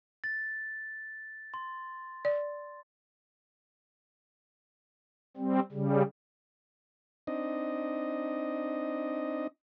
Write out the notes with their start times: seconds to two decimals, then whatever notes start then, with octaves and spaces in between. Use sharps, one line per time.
0.24 A6
1.54 C6
2.25 D5
5.37 G3 C4
5.72 C#3 G3
7.27 C4 D4 D#4 D#5